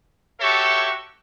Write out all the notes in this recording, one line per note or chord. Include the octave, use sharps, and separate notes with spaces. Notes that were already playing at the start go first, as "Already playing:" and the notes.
F#4 G4 A4 C#5 E5 C#6